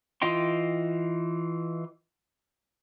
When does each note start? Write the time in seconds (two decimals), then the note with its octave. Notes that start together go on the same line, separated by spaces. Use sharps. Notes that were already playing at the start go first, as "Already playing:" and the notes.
0.22 E3 F4 D#5 G5 C6